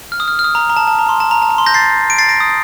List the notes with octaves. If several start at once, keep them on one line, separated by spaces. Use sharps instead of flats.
F6
D#6
F6
F6
D#6
A#5
A#5
A5
A5
A#5
C6
A5
A#5
A5
A#5
C6
G6 A#6
A6 C7
D7
A6 C7
A#6 D7
D#6